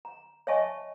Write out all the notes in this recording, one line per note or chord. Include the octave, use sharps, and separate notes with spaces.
A#5
C#5 D#5 E5 G#5 A5 C#6